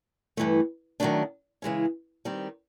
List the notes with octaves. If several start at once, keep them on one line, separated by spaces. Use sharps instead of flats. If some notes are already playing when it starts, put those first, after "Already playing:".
G2 E3 A3
D#3 F#3 A3 D4
C#3 E3 G#3 C#4
D#3 G3 C4